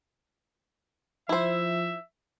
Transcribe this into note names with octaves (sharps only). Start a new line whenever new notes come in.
F3 E4 C5 E5